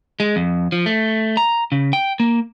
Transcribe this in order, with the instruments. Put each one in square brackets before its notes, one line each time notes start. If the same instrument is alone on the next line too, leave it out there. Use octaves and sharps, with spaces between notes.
[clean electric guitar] G#3
F2
F3
A3
A#5
C#3
G5
A#3